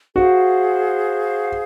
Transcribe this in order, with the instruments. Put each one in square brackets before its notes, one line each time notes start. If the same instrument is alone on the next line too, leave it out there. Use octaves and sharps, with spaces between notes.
[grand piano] F#4 [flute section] G#4 C5 F5